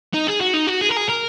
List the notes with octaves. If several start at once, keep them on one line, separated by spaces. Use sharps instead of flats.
D#4
G#4
F#4
D#4
F#4
G#4
A#4
G#4
A#4